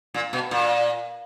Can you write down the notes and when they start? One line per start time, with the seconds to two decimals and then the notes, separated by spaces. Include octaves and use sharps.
0.14 A#2
0.33 B2
0.51 A#2